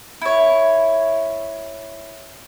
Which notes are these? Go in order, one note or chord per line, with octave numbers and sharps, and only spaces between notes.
E4 C#5